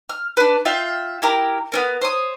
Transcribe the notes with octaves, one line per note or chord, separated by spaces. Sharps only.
F6
D4 B4
F4 E5 F5 G5
E4 G4 A#4
B3 C#4 A#4
C5 C#5 D#6